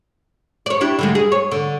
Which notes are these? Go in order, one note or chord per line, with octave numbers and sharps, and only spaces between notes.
C#5 D5
D4 E4 G4
D3 G3 G#3
G#4
C#5
D3